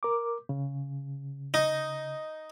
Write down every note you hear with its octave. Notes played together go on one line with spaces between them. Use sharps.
A#4 D6
C#3
D#4